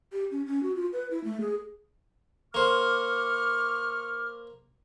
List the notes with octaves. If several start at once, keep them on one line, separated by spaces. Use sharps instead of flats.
G4
C#4
C#4
F#4
F4
B4
E4
A3
G#4
A#3 C5 C#6 D6 F6